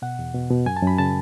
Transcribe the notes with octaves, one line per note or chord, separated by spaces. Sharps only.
B2 F#5
E2
B2
B2
F#2 G#5
A5
F#2 B5
C#3 A5